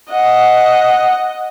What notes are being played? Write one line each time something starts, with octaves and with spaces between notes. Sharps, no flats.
D#5 F#5